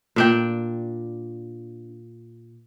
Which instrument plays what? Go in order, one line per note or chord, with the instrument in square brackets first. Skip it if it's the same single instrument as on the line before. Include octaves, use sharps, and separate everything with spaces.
[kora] A#2 D4 G5